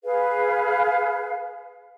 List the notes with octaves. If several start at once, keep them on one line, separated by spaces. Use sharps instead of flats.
G#4 B4 F5